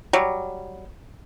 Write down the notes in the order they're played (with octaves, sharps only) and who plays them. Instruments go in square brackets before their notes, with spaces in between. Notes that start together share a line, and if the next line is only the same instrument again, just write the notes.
[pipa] F#3 G3